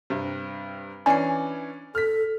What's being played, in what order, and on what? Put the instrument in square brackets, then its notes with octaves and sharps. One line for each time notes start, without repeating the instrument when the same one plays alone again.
[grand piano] G2 C3
[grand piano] E3 C#4 D4 [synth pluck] G#5 C7
[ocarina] A4 [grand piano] F6 B6